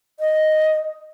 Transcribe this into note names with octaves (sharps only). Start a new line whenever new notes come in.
D#5